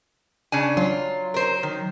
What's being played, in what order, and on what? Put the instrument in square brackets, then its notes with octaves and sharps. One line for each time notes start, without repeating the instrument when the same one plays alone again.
[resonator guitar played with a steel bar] C#3 D4 G#5
[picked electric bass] F#3 [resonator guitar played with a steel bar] F4
[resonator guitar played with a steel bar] A#4 C5
D#3